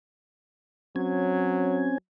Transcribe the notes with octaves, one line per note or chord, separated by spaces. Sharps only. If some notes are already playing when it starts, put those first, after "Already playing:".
F#3 C4 C#4 G#5